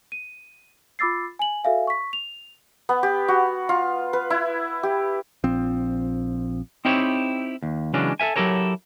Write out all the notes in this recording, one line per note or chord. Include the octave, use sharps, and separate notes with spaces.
D#7
F4 B5 D6 E6 A6 C7
G#5 F#7
F#4 A4 E5 F5 G#5
C#6 B6
F7
B3
G4
F#4
F4
B4
E4
G4
A#1 F3 C4
C4 D#4 E4 G4 C5 C#5
D#2
C#3 E3 F#3 G#3 C#4 D4
A4 A#4 E5 G#5
F#3 E4 G4 A4 A#4 C#5